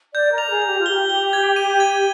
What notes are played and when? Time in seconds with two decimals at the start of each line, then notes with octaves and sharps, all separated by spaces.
0.15 D5 G6
0.32 A#4
0.38 F7
0.50 G#4
0.62 F7
0.68 G4
0.79 F4
0.86 G4 G7
1.10 G7
1.33 G#6
1.56 D#7
1.80 G#6